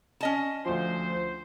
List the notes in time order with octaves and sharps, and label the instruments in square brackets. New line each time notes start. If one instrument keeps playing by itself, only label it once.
[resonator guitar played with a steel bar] C#4 D#5 A5
[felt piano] D2 F3 [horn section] C5